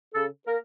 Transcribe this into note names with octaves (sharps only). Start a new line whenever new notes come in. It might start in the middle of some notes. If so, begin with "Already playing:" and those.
C#3 A4
A#3 A#4